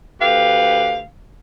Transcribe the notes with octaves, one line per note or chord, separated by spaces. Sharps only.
D2 G4 B4 F5